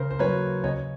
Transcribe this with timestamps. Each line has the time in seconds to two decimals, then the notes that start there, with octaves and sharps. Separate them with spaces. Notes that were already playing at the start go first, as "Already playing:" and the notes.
Already playing: C#3 A#4 C5
0.10 C5
0.19 F#3 A#3 B4 C#5
0.64 C#3 C#5 D#5